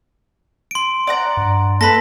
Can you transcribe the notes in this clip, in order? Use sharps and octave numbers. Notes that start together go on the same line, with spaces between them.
C6 D7
D5 F#5 A#5
G2
A#3 A4 B4 A#6 B6